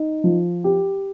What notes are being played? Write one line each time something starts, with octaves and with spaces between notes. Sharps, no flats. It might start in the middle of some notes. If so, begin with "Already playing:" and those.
Already playing: D#4
F3
G4